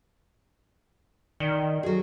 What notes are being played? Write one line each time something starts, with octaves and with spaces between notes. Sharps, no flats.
D#3 D5 C#7 G7
F#3 F#4 G#4 A4